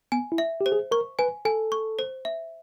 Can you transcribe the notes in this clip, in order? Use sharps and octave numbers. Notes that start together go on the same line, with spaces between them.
B3 G#5
E4
E5
G4
C5
G#4
A#4 C#6
B4 G#5
A4 G#5
C#6
C5
E5